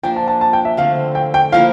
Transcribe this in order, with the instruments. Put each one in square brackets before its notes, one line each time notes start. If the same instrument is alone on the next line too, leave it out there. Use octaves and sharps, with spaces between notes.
[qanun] F3 A#3 D4 [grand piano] G5
[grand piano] A5
A5
A5
G5
E5
[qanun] D3 A3 C4 [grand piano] F5
[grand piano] G5
G5
[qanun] F3 A#3 E4 A#4 [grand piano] F5